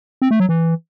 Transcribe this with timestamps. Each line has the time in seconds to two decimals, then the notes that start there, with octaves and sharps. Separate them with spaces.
0.22 C4
0.31 A3
0.40 F#3
0.49 E3